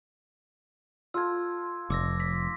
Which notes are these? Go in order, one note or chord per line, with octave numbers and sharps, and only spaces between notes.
F4 A4 E6 G#6
F1 D6 E6 A#6
B6